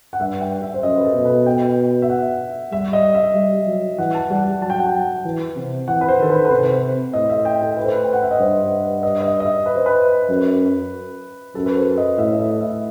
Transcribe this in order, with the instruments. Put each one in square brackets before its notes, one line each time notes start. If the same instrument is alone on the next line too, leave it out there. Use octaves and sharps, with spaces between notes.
[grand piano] F#5
[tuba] G2 [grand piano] E5
[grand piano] G5
E5
C5
[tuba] F#2 [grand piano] D#5
[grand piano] B4
A4
[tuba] B2
[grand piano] B4
G5
E5
F#5
[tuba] G3 [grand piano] E5
[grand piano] D#5
E5
[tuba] G3
F#3
[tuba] E3 [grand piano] F#5
[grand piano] A5
[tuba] G3 [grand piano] F#5
[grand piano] F#5
[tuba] F#3 [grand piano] A5
[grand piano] G5
F#5
G5
[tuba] E3
C3
[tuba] E3 [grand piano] F#5
[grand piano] B4
C5
[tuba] D#3 [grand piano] A4
[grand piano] B4
B4
[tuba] C3 [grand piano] C5
[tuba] A2 [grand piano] D#5
[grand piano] E5
G5
A4
B4
C5
B4
G5
F#5
E5
D#5
[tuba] G2 [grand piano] C5
[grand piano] D#5
D#5
E5
D#5
E5
B4
C5
B4
[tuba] F#2
[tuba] F#2 [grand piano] A4
[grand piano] B4
C5
D#5
[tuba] A2 [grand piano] E5
[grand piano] E5
D#5
E5